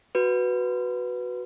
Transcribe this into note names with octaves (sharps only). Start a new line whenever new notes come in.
F#4 B4